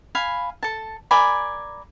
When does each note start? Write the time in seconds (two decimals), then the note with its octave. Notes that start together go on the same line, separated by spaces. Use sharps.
0.15 F5 G#5 B5
0.63 A4 A5
1.11 A#4 D5 G#5 B5